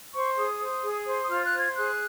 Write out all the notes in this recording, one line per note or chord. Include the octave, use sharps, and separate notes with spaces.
C5 C#6
G#4 D#6
C5
G#4
C5
D#6
F4 F6
F#6
C5
G#6
G#4 F#6